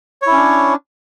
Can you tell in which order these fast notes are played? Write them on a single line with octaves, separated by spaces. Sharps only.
C#5 E4 C#4 D4